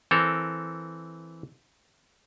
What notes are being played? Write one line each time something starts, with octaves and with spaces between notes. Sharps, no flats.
E3 C4 A4 A#4